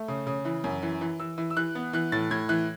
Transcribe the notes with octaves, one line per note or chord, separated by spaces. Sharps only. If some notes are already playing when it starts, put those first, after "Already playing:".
Already playing: A3
C#3
C#3
E3
F#2
E3
E3
E3 E6
E3
E6
E3 F#6
B3
E3 F#6
A2 A6
A2 G#6
E3 F#6